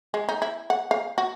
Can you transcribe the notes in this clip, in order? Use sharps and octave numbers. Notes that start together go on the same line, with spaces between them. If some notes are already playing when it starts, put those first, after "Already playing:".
G#3
D#4
E4
F#5
F5
F#4